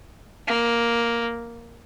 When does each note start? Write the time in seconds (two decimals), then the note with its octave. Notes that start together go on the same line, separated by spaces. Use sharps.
0.47 A#3